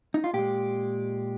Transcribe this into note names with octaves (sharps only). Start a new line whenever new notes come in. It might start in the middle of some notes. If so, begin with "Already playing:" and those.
D#4
F4
A#2 G#3 G4